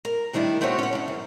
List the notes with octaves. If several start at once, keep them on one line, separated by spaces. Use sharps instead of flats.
A#4
A2 D#3 G3 D4 E4
A3 C4 D4 F#4 C#5
C#4 F#5
G2 C#3
F#2